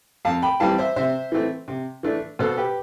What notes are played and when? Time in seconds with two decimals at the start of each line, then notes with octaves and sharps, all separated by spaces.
0.25 F2 F5 A5
0.42 G5 B5
0.60 E3 G3 C4 F5 A5
0.78 C5 E5
0.96 C3 C5 E5
1.32 E3 A3 C4
1.68 C3
2.03 E3 A3 D4
2.39 B2 A4 C5
2.57 G4 B4